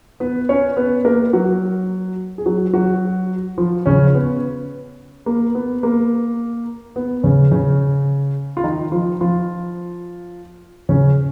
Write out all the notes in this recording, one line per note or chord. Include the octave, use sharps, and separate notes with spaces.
B3 B4
C#4 C#5
B3 B4
A#3 A#4
F#3 F#4
G#4
F#3 F#4
F#3 F#4
F3 F4
C#3 C#4
C#4
B3
A#3
B3
A#3
B3
C#3 C#4
C#3 C#4
F4
D#3 D#4
F3 F4
F3 F4
C#3 C#4